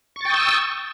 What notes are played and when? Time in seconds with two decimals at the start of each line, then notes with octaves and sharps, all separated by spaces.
0.16 C#6
0.21 A6
0.25 G5
0.30 D#6
0.34 E6